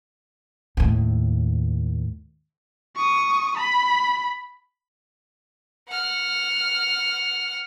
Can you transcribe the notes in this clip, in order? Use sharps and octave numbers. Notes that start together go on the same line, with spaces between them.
D#2 A2
C#6 D#6
B5
F#5 F6